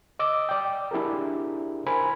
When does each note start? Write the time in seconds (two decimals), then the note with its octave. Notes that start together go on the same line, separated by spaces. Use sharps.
0.19 D#5 D6 E6
0.49 D5 G5
0.91 D4 E4 G4 G#4 A#4
1.87 A#4 C5 G#5 B5